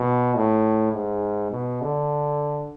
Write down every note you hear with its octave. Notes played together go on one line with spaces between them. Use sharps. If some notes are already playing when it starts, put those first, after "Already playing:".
Already playing: B2
A2
G#2
B2
D3